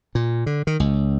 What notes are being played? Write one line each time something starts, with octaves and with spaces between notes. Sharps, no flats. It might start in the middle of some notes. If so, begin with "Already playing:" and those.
A#2
D3
D#3
C#2